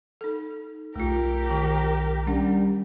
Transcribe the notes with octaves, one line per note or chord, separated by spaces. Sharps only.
D#4 A4
B1 A3 F4 G4 A#4
D#3 A5
G3 C#4 D4 F#5